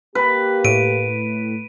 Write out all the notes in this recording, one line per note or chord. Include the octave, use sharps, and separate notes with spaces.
A#3 G4 B4
A2 D7 D#7